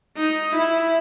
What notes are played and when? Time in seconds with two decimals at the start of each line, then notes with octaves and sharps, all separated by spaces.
0.17 D#4
0.56 E4